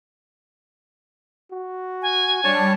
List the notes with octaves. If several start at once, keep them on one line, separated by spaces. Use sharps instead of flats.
F#4
G#5
G3 D4 C#5 A5